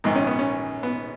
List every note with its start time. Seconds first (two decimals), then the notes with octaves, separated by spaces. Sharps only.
0.04 A#1 G#2 D#3 D#4
0.15 C#4
0.27 B3
0.39 C#4
0.83 B3